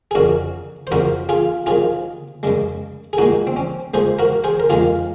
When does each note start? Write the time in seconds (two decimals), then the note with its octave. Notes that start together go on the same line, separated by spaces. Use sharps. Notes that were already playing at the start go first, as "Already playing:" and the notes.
0.11 G#4
0.15 F2 C#3 F#3 F#4 A#4
0.87 C5
0.91 F#2 C#3 F3 F#4 A#4
1.29 F4 G#4
1.66 C3 D#3 F#3 F4 G#4
2.43 F#2 C#3 G#3
3.13 G#4
3.18 A#2 G#3 D#4 F#4
3.47 C4
3.56 C#4
3.94 G#2 F3 G#3 G#4 C5
4.19 F#4 A#4
4.44 G#4 C5
4.60 A#4
4.70 F2 D#3 G#3 F4 G#4